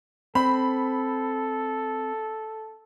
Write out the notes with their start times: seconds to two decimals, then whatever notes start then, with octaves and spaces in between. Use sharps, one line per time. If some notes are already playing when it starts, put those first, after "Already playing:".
0.35 C4 A4 B5